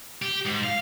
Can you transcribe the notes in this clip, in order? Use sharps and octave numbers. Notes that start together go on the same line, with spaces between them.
G4
G#2
F5